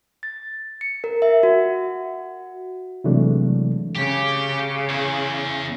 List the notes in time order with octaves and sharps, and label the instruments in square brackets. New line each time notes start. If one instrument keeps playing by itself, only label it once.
[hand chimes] A6
C#7
A#4
E5
F#4
[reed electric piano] C3 E3 F#3 G#3 A3 D4
[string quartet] C#3 [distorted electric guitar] G4
[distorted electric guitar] E2